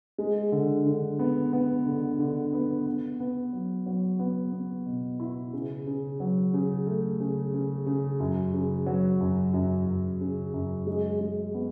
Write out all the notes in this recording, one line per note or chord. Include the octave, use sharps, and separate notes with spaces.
G#3
D3
D3
B3
B3
D3
D3
B3
B3
B3
F#3
F#3
B3
B3
B2
E4
C#3
C#3
F#3
C#3
A3
C#3
C#3
C#3
F#2
C#3
F#3
F#2
F#2
F#2
C#3
F#2
G#3
G#3
B3